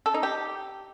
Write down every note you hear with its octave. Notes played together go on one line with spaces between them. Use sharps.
A4
D#4
G4